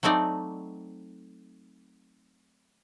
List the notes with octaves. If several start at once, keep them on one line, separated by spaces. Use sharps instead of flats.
F#3 A3 C4 D#4 D5